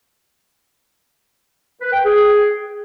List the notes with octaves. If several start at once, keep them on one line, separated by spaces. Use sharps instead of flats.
B4
G5
G#4